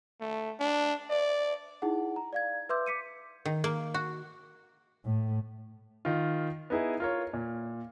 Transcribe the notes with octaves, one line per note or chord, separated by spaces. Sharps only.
A3
D4
D5
D#4 E4 G#4 F#5
A#5
D5 F5 G#6
B4 E5 C6 D6 E6 G6
D6 B6 C#7 D#7
D#3
A#3
F#4
A2
D#3 F4
B3 D#4 E4 G#4
F4 A#4 C#5
A#2